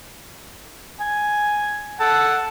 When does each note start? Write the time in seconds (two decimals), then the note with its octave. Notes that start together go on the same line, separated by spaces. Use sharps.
1.00 G#5
2.00 A4 F#5 A5